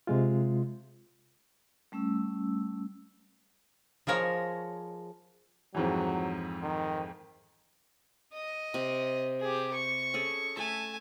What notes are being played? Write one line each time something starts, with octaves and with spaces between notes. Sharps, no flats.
C3 G#3 F4
G3 A3 C#4 E6
F3 G#3 A#4 C#5
F2 G#2 E3 F#3
D#3
D#5
C3
G4 G#4
C#6
C#4 G#4 A4
A3 E5 G#5 A5